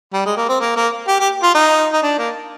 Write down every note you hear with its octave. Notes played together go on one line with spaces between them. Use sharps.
G3
G#3
A#3
C4
A#3
A#3
G4
G4
F4
D#4
D#4
D4
A#3